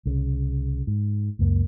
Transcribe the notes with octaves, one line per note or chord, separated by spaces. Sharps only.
C2 C#3
G#2
C#2 F#2 A#3